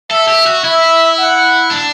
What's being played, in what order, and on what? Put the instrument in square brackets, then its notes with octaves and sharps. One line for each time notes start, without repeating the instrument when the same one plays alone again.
[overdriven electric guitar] A4 [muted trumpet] E5
[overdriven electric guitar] G4
F#4
[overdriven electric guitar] E4 [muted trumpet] E5
[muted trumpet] F#5
[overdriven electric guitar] D4